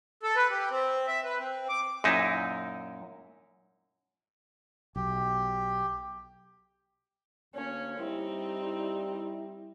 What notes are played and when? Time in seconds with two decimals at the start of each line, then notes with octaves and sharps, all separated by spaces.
0.23 A4
0.36 B4
0.50 G4
0.70 C4
1.07 E5
1.24 B4
1.39 C4
1.69 D6
2.04 F#2 A#2 D#4 E4
4.96 B1 G4
7.55 D2 A#3 C#4 C#5
7.99 G3 C4 D#4 E4